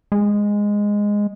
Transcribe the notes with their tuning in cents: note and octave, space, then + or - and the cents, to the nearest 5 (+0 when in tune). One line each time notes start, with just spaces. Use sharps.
G#3 -10